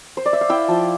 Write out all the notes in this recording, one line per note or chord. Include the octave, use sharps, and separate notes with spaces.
C5
D5
E5
F5
E4 E5 G5
F3